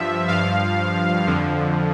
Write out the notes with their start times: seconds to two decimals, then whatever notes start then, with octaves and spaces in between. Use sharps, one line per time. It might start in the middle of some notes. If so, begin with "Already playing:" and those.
Already playing: G2 F3 E5
0.28 G2 F3 F5
1.27 F2 D3 F3